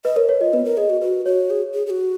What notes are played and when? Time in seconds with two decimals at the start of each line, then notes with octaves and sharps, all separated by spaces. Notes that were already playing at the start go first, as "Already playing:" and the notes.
0.05 B4 D#5
0.16 A#4 C#5
0.29 B4 C#5
0.41 F4 D#5
0.53 B3 B4
0.65 A#4
0.77 G#4 D#5
0.90 F#4
1.01 F#4 B4
1.26 F#4 C#5
1.50 G#4
1.74 G#4
1.86 G#4
1.90 F#4